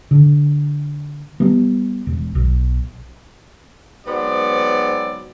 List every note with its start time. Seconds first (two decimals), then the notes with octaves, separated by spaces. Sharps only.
0.11 D3
1.40 G3 B3
2.07 E1
2.35 B1
4.06 G#2 F#3 B3 C4 D5